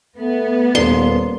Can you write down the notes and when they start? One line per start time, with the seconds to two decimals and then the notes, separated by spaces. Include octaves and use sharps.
0.18 A3 B3
0.75 D#1 A#3 D5 C6